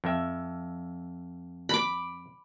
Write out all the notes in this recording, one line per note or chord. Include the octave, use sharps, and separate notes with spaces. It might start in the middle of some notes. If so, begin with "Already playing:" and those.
F2 E5
B5 D6